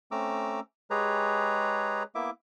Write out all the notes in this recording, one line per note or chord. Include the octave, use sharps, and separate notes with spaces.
A3 C4 C#4 A#5 D6 E6
G#3 G4 G#4 B4 C#5 A#5
A#3 B3 E4 E5 D6